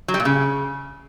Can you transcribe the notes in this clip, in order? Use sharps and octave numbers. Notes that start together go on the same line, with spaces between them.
F#3
G3
A#2
C#3